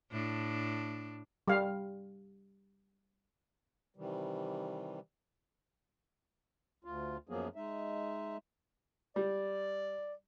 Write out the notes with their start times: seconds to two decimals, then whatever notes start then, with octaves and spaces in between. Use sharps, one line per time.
0.12 A2 D4
1.48 G3 F5
3.96 C3 D#3 E3 G3
6.85 D2 F4
7.29 F#2 F3 F#3 A#3 B3 G#4
7.56 G#3 D#4 E5
9.16 G3 D5